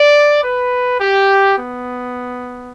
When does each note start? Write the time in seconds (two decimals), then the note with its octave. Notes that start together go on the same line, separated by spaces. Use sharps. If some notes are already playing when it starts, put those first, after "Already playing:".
Already playing: D5
0.43 B4
0.99 G4
1.55 B3